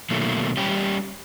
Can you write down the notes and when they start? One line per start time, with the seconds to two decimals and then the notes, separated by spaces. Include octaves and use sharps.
0.10 B2 D#3 F#3 A3 A#3
0.57 G3 C#4 G4